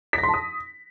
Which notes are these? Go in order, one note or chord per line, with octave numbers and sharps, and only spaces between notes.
B6
A#6
C6
A5
D#6